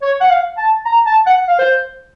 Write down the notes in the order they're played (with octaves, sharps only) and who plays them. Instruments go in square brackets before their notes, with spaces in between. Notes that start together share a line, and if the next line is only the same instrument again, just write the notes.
[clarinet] C#5
F#5
F5
A5
A#5
A5
F#5
F5
C5